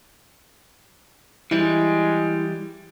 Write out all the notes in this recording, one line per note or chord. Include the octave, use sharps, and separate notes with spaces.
E3 G3 G#3 E4